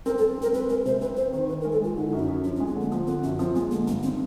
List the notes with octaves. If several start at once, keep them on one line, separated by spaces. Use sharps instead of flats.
C4 A#4
A4
C4
C4 A#4
C4 B4
G#3 A#4
C3 C5
C4 B4
C4 C5
D#3 C5
D#3 B4
A#4
G#3
A4
G#3 F4
D3 D#4
E4
F#2
D#4
F#2
F3 D4
C#4
G#3
C4
D3 A#3
F3 B3
D3 C4
F#2 C#4
F3 C4
G#3 B3
D3 A#3
G2 B3
D#3 C4